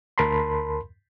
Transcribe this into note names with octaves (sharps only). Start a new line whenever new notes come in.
D2 A#4 A5 B5 C6